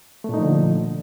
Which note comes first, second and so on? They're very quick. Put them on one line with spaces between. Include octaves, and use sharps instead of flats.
A3 A#2 D#4 F3 D3